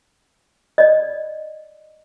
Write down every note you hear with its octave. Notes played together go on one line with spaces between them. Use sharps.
D5 D#5